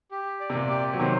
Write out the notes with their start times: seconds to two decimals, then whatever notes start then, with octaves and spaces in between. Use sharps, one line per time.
0.11 G4
0.40 D5
0.50 C3
0.55 A#2
0.70 G4
0.94 F#3
1.00 C3 D#3 C5